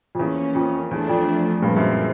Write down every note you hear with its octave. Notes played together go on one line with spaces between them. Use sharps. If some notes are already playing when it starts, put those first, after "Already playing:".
F2
E2 F3 A#3 C#4
F2
E2 F3 A3 D4
F2
G2 A#2 F3 G#3 C4
F#2